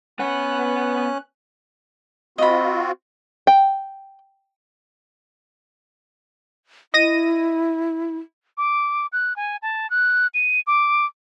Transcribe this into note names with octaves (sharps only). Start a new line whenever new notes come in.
B3 C#4 F#5 F#6
C4 F4 F#4 D#5 B5
G5
E4 D#5 A#6 D#7
D6
F#6
G#5
A5
F#6
D#7
D6